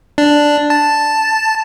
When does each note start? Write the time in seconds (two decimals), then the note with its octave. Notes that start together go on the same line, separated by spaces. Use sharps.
0.18 D4
0.70 A5